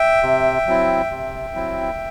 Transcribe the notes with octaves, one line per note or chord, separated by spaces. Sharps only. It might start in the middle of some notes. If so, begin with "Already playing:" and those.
Already playing: E5 G5
C3
F#3 C4 E4
C3
F#3 C4 E4